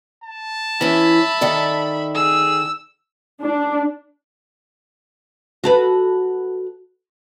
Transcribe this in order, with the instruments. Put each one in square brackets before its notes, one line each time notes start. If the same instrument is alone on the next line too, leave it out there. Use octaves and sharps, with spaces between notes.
[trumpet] A5
[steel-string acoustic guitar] E3 C#4 [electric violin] E5 B5
[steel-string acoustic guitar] D#3 A4 D5
[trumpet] G#4 [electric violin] E6
[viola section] D4
[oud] F#4 A4 B4